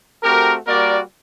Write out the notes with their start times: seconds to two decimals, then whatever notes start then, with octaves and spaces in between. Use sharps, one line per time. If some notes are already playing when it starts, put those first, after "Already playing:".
0.23 A3 C4 F#4 G4 A#4
0.67 G3 A#3 F#4 A#4 D5